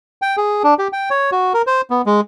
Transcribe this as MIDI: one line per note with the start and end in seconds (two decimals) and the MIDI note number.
0.22 0.36 79
0.37 0.63 68
0.64 0.74 62
0.79 0.88 67
0.93 1.09 79
1.10 1.30 73
1.32 1.53 66
1.54 1.62 70
1.67 1.81 72
1.90 2.02 59
2.06 2.21 56